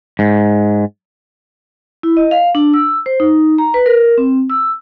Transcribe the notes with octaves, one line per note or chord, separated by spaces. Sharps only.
G#2
E4
D#5
F5
D4
E6
C5
D#4
A#5
B4
A#4
C4
E6